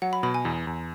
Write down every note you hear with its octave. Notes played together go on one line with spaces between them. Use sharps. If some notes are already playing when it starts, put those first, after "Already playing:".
F#3 F#5
B5
B2 B5
G#5
E2
E2